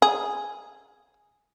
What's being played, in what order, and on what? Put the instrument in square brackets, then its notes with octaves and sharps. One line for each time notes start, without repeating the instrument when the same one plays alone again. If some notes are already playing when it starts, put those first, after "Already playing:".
[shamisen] G#4